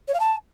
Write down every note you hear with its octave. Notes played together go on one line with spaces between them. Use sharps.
C#5
F5
A5